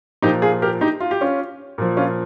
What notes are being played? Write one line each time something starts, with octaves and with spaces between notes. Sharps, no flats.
A#2 F3 D#4 G4
F4 G#4
G4 A#4
D#4 G4
F4
G4
C#4 F4
A#2 F3
C#4 F4